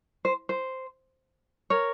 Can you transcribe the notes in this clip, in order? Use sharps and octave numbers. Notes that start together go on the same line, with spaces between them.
C5
C5
A#4 C#5